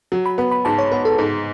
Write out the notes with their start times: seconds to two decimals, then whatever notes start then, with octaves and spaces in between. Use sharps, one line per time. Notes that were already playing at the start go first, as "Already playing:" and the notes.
0.12 F#3
0.26 B5
0.38 B3 B5
0.51 B5
0.65 G#2 A5
0.78 C#5
0.92 B3 B4
1.05 A4
1.18 G#2 A4